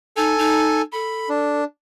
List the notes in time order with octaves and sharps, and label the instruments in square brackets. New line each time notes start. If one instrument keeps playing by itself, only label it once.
[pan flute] D#4 [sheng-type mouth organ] A4 G#5
[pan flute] D#4
[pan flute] A4 [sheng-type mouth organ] B5
[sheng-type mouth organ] D4